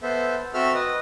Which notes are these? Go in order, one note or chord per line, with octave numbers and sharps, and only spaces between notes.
B3 A4 C5 E5
C4 F#4 A4 E5 E6 F6
B4 D#5